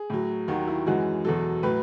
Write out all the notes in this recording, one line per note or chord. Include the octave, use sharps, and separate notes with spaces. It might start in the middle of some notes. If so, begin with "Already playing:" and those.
Already playing: G#4
A2 F#3
D#2 D#3 F#3 F#4
E4
F#2 E3 G#3 F#4
E2 B2 F#3 A4
A2 F#3 B4